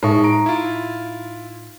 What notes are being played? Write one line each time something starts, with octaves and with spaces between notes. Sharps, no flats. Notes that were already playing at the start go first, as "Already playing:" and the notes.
A2 G#3 D#4 A4 E5 C#6
A#5 D7
E4 F4